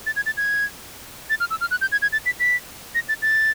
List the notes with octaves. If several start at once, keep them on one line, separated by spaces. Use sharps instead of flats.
A6
G#6
A6
G#6
A6
F6
E6
F6
F#6
G6
G#6
G#6
A6
B6
B6
A#6
A6
A6